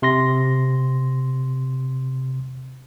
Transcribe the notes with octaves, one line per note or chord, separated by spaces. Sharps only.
C3 C6 A#6